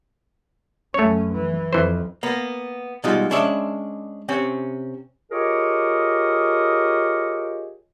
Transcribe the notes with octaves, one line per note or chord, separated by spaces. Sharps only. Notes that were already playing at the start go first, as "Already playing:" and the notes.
F#2 A3 C#4 C#5
E3
F2 E3 C5
A#3 B3
B2 G3 G#3 D#4 F4
G#3 C#4 D4 E5
C3 C4 C#4
F4 G4 G#4 A#4 C#5 D#5